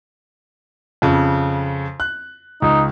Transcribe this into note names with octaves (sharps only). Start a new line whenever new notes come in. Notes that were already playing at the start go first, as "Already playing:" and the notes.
F2 C#3
F#6
C#2 D#4